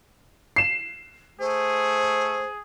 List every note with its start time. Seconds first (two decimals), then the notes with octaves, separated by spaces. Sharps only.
0.56 C7 E7
1.40 A3 G#4 C5